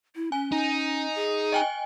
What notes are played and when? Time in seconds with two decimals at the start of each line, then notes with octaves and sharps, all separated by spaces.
0.16 E4
0.32 C#4 G#5
0.52 D#4
1.15 G#4
1.52 D#5 G5 G#5